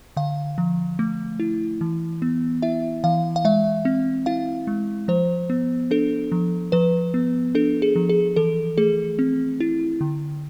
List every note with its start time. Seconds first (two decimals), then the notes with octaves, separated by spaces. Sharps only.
0.17 D3 F5
0.58 F3
0.99 A3
1.40 E4
1.81 E3
2.22 B3
2.62 E4 E5
3.04 E3 F5
3.36 F5
3.45 G#3 E5
3.85 C4
4.26 E4 F5
4.67 G#3
5.08 F3 C5
5.50 B3
5.91 D4 A4
6.32 F3
6.72 F3 B4
7.14 B3
7.55 D4 A4
7.82 G#4
7.96 F3
8.09 G#4
8.36 E3 A4
8.78 A3 G#4
9.19 C4
9.60 E4
10.01 D3